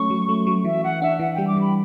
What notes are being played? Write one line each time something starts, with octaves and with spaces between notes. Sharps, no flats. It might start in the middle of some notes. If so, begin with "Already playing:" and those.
Already playing: F#3 A3 C#4 C#6
F#3
A3
F#3
E3 E5
E3 F#5
D4 E5
E3 F#5
G3 G5
D6
E3 B5